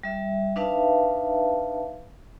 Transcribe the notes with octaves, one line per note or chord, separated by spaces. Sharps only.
G3 E5
D4 D#4 B4 E5 F5 A5